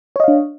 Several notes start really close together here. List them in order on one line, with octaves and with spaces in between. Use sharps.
C#5 D#5 F5 D4